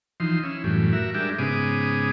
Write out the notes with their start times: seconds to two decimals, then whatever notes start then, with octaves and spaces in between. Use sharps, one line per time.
0.20 E3 F3 D#4 C6
0.44 C#4 E4
0.64 F#2 A2 E3 G3
0.93 F#4 A#4 E5
1.14 G3 G#3 D4 G4 A#4 E5
1.39 G#2 C#3 B3 G#4 D6 D#6